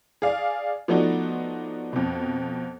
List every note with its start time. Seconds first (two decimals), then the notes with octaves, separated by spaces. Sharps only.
0.22 G#4 D5 F5
0.88 F3 A3 B3 D4 D#4 F#4
1.93 F2 B2